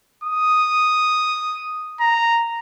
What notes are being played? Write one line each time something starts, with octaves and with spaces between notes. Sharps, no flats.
D#6
A#5